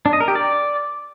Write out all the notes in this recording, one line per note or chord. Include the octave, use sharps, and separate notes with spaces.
D4
D#5
A#4
G4
D5